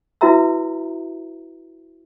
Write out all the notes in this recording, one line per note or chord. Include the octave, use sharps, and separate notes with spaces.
E4 F#4 B4 E5 A#5 E6